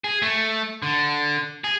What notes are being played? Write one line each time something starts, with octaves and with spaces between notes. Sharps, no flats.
G#4
A3
D3
G#4